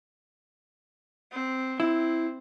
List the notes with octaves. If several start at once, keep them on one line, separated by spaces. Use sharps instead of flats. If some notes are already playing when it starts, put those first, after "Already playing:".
C4
C4 E4